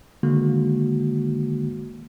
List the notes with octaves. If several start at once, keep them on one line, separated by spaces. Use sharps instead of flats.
D3 D#3 G#3 A#3 F#4